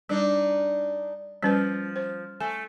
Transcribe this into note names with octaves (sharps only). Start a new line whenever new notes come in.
G3 D4 D#4
F3 G3 C#4 B4
C5
A3 G#5